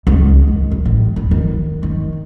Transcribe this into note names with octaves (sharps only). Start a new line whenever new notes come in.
C#2
D#3
F#2
A1
E2
D#3
D#3